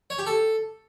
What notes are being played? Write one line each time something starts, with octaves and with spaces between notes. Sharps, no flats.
C#5
G4
A4